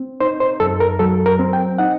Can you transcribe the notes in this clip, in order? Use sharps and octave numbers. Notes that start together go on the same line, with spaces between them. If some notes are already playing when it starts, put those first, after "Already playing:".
Already playing: C4
D#4 C5
C5
F#2 A4
A#4
F#3 A4
A#4
C4
G5
D#4 F#5